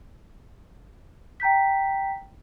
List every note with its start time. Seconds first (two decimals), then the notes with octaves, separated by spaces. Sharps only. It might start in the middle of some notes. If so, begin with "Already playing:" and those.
1.40 G5 A#5 G6 B6